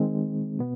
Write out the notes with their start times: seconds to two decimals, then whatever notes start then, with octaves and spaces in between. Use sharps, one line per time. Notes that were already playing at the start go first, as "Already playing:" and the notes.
Already playing: D#3 G#3 C4
0.59 B2 B3